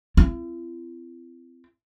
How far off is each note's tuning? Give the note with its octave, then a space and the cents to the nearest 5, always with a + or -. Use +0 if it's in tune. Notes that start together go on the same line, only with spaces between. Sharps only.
C4 -20 E4 +45